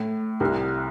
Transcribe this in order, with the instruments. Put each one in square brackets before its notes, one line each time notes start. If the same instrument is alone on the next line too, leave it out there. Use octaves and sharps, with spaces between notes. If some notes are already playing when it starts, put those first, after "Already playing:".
Already playing: [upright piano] A2
C2 C3